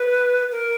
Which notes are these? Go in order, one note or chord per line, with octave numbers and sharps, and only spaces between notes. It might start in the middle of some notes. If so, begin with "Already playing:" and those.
Already playing: B4
A#4